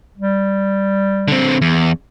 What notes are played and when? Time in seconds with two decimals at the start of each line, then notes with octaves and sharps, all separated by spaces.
0.17 G3
1.28 D3 C4
1.62 E2